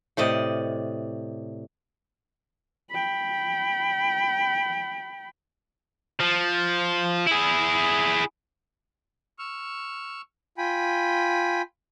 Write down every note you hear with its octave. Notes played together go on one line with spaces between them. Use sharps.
A2 C3 D5 D#5
G5 B5
F3
E4 G#4
C#6 E6 F6
F4 G5 G#5 B5